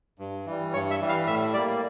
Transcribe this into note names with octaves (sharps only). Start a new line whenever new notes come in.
G2
E3 G3
G2 C#5
E5
E3 G3
F5
A2 E5
G3 A#3 D5